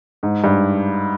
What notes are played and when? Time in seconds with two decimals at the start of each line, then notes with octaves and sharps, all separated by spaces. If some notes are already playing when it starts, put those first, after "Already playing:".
0.23 G#2
0.44 G2